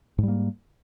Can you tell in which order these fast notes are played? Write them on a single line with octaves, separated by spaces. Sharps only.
G#2 G3 A#3